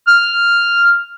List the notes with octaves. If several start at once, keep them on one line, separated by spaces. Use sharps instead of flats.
F6